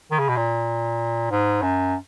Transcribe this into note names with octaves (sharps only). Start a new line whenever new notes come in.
D#3
C#3
B2
A#2
G#2
F#2